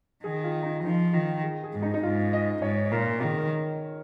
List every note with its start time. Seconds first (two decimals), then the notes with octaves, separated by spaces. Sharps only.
0.24 D#3 G#4
0.44 F4
0.63 D#4
0.84 F3 D#4
1.13 D#3 F4
1.43 G#4
1.64 G#4
1.73 G#2
1.82 D#4
1.94 D#4
2.03 G#2 F4
2.33 D#5
2.62 G#2 C#5
2.92 A#2 A#4
3.22 D#3 G#4
3.37 A#4